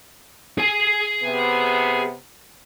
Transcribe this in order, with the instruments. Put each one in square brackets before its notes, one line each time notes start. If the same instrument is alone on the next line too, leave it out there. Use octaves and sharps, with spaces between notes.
[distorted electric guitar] G#4 G#5
[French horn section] C3 B3